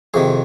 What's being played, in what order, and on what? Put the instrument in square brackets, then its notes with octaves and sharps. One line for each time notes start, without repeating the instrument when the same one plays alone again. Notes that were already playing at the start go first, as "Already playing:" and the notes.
[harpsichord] F2 C3 D#3 G#4